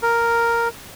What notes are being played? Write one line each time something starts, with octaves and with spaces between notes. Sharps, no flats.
A#4